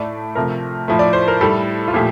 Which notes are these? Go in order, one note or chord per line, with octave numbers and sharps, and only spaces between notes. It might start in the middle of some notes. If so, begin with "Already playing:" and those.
Already playing: A2 A3 D5
C3 F3 A3 A#4
A2 F3 A3
D5
C5
A#4
A2 G3 A4
F4
A#2 F3 A3 G4